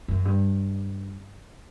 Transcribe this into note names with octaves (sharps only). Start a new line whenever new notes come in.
F#2
G2